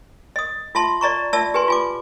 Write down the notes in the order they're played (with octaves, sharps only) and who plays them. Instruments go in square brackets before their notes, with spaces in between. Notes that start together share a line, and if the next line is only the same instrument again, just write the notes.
[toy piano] D#5 D#6
F4 E5 A5 C6
D5 D#5 A#5 C#6
F4 D5 E5 A5 E6
G4 B4 G#5 C6
F4 G#5 D6